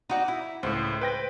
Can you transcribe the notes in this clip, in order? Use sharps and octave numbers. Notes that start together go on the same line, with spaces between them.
D#4 F#4 D5
E4
C#2 A2 C5
B4 G5 A#6